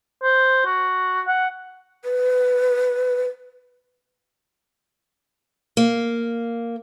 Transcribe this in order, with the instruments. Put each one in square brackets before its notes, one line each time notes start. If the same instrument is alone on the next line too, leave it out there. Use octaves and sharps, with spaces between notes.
[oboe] C5
F#4
F#5
[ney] B4
[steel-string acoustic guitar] A#3